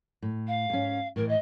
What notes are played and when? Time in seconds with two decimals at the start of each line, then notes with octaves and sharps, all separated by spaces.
0.22 A2
0.47 F5
0.70 G#2 C#4
1.16 A2 E3 A#4
1.28 D#5